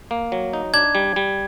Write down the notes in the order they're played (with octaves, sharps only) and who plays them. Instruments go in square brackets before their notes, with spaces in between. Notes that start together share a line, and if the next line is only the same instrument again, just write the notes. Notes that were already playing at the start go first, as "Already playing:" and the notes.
[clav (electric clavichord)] A#3
F#3
D#4
[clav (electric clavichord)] D4 [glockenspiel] G#6
[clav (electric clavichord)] G3
G3